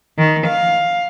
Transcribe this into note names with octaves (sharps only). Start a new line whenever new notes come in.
D#3
F5